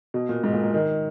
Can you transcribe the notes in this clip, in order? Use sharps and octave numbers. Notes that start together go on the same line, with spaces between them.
B2
A#2
G#2
A#2
A#2
D#3